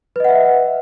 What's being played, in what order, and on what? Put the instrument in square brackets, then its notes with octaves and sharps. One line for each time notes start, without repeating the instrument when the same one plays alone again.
[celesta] B4
D#5
F#5
E5